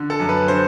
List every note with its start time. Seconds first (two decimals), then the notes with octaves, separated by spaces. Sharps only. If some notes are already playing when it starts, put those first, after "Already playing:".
Already playing: D3
0.10 A4
0.20 F#2
0.29 B4
0.48 D3 C5